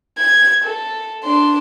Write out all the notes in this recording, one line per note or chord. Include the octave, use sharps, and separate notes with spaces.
G#6
A4
D4 C6